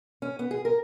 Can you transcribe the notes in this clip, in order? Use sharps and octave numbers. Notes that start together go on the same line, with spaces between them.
C#4
B3
G#4
A#4